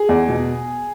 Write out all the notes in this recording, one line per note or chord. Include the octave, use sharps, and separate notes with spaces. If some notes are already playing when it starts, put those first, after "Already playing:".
Already playing: G#4
E2
B2